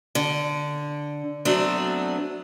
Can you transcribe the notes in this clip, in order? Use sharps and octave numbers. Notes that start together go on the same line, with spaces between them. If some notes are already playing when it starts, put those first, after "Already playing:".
D3
F#3 A3 B3 C4 D4